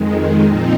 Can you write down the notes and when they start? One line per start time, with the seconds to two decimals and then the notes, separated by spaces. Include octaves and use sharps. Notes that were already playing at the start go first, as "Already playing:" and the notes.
Already playing: F2 D#3 G#3
0.42 A#2 F3 C4 D#4